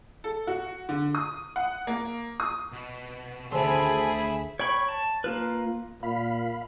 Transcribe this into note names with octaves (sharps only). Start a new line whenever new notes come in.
A4
F#4
D3
D#6
F#5
A#3
D#6
B2
D2 D#3 G#4 A4 C5 E5 B5 C6
C#5 G5 B5 C#6
A5
A#3 F4 B4
A#2 F5 B5